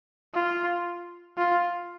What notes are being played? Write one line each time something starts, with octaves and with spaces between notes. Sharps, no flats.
F4
F4